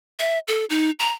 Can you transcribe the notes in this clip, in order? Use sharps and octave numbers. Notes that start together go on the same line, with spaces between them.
E5
A4
D#4
A#5